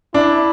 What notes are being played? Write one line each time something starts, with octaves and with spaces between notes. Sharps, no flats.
D4 E4